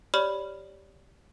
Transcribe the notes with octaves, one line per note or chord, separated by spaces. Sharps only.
G4 C#5 D5 B5 F6 F#7